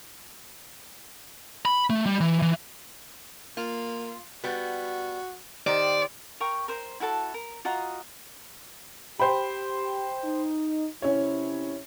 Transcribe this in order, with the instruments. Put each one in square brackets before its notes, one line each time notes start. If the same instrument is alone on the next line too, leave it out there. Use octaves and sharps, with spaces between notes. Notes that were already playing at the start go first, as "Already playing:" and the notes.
[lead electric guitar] B5
A3
G3
E3
E3
[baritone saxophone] A#3 [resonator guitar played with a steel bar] F4
[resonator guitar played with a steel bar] G3 B3 [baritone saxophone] F#4
[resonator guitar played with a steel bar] D#3 C5 [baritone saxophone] G4 [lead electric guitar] D5
[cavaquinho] A#4 G5 A#5 C#6
A#4 C5
E4 F#4 A4 A5
A#4
F4 F#4 D#5 A#5
[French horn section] G4 [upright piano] C5 G5 B5
[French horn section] D#4
[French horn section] C3 E4 [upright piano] C#4 C#5